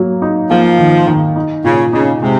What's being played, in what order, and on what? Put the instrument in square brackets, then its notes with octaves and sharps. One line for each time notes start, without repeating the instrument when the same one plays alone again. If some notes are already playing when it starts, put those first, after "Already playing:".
Already playing: [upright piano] F#3 A#3
D#4
[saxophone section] F3 [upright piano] A#3
[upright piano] D#3
D#3
D#4
[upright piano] A#2 [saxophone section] C#3
[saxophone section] C#3 [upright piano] D#4
[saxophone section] C3 [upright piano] G#3